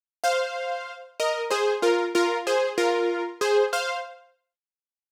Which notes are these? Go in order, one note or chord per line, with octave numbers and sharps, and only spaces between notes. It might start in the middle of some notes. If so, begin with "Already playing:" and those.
C5 F5
A#4 D#5
G#4 C5
F4 A#4
F4 A#4
G#4 C5
F4 A#4
G#4 C5
C5 F5